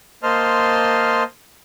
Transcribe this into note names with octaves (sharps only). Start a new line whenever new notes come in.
A#3 C5 D#5 A5 C6 F6